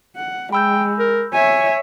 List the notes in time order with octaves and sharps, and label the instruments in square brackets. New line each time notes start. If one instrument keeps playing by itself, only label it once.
[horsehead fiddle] F#5
[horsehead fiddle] G#3 [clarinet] G5 [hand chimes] B5 E6 G6
[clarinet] A#4
[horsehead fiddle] C#5 E5 [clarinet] G#5